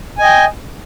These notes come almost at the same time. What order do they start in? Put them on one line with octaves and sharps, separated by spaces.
G#5 D#5 G5